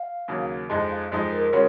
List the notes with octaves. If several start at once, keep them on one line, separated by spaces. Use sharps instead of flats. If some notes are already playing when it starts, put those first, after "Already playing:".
Already playing: F5
D#2 C#3 F#3
F2 F3 G#3 D#4 D#5
F5
F2 F3 G#3 D#4
A#4
C#3 G#3 C#4 F#4